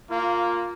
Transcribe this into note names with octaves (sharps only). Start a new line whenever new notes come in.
A#3 F4